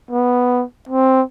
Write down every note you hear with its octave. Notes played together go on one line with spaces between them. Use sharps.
B3
C4